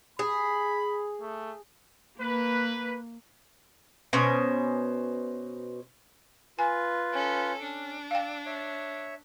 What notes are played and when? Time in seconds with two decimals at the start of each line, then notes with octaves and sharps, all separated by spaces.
0.19 G#4 B5
1.21 A3
2.20 A#3 B4
4.13 B2 C#4 C5 G#5
6.59 F4 B4 G#5
7.13 C#4 A4
7.62 C#4 D4
8.11 D5 F5 G5 E6
8.46 C#5 E5